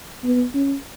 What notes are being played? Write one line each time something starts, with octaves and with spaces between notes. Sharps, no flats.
B3
C#4